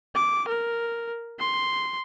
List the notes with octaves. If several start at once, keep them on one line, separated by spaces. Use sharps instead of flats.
D6
A#4
C6